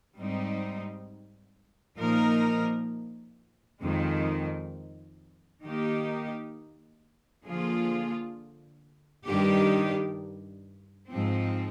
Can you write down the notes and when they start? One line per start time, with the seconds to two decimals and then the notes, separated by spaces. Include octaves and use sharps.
0.16 G#2 G3 C4 D#4
1.97 A#2 F3 A#3 D#4 A#4
3.81 F2 D#3 G#3
5.63 D#3 A#3 D#4 G4
7.46 D3 F3 A#3 F4 G#4
9.27 G2 D#3 G3 D4 G4
11.09 G#2 F3 C4